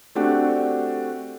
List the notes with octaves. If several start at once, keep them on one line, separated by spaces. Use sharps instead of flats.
A3 C4 D4 F#4 G4